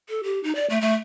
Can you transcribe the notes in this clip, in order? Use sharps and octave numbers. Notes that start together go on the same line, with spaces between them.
A4
G4
D#4
D5
A3
A3